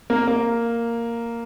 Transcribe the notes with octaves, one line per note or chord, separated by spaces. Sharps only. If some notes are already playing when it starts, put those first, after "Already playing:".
A#3
A#3